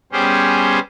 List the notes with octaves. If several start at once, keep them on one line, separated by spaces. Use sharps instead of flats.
G3 B3 C#4 G4 G#4 C5